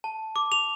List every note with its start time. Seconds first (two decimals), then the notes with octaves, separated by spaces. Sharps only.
0.04 A5
0.36 D6
0.52 F7